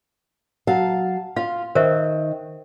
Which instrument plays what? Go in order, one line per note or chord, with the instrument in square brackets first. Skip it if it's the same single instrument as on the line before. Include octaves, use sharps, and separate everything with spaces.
[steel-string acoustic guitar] F#3 F5 A5
[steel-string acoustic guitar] F4 [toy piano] F5
[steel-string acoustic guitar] D#3 [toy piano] A#4 C5 E5